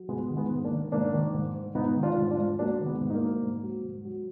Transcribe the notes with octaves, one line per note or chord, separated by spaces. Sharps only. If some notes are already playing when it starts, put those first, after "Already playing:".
Already playing: F#3
G#2 G#3 B3
D#3
G#3 B3
G#2
A#3 D4
D#3
G#2 A#3 D4
D#3
G#2
G#2
G#2 B3 D#4
D#3
D4 F4
G#2
D4 F4
G#2
F#3 A#3 D4
D#3
G#3 B3
G#2
D#4
A#3 D4
F#3
G#2
F#3
G#2
F#3